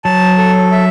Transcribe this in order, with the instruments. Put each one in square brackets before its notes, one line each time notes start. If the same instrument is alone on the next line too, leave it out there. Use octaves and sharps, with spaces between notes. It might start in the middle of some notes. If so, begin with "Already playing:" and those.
[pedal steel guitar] F#3 [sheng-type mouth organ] A5
[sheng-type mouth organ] A4
E5